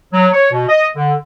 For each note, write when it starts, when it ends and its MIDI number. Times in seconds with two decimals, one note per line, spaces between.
0.13 0.28 54
0.33 0.50 73
0.52 0.65 47
0.69 0.87 75
0.96 1.14 50